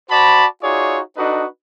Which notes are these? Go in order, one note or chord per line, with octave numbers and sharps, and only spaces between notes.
F#4 C5 D5 A5 B5
D#4 F4 F#4 G#4 C#5 D5
D4 D#4 F#4 A4 B4 D#5